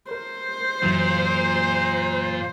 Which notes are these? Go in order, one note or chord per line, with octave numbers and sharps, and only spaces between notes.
A#4 C5
F#2 A#2 E3 F#3